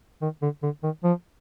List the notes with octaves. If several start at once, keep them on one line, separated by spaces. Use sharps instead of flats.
D#3
D3
D3
D#3
F3